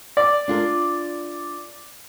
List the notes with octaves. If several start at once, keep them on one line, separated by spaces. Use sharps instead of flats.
D5
D4 F4 A#4